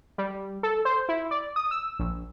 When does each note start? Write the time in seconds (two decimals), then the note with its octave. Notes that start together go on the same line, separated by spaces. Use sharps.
0.18 G3
0.63 A4
0.85 C5
1.09 E4
1.31 D5
1.56 D#6
1.71 E6
1.99 A#1